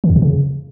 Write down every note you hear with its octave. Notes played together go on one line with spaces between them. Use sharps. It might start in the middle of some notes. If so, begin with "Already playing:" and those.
D#3
E2
B2
C#3